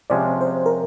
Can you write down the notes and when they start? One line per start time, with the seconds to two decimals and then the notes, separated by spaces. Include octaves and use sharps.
0.10 C3 F3 G#3 C#4 D5
0.41 C5
0.66 A#4